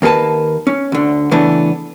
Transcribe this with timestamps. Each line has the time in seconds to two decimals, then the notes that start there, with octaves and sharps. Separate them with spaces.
0.02 D#2 A#3 G#4 B4 A5
0.67 C#4
0.92 D2 D3
1.31 C#3 E3 A3 B3 D4